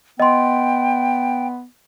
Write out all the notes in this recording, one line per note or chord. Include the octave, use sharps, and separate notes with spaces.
B3 D#5 G5 C6